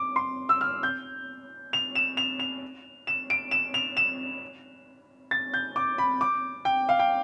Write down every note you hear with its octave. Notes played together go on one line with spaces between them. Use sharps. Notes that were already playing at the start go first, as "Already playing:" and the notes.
Already playing: D6
C6
E6
F6
G6
F7
E7
F7
F7
E7
D7
E7
F7
E7
A6
G6
D6
B5
D6
G5
F5
G5